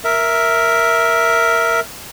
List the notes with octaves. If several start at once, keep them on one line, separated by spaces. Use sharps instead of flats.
A#4 E5